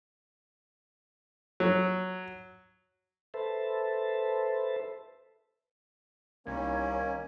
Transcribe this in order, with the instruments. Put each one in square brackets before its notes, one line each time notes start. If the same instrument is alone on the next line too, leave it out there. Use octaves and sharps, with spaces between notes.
[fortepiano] F#3
[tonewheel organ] A4 B4 C5 E5 A5
[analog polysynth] C2 [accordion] D#3 C#4 [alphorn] A#3 [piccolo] G#6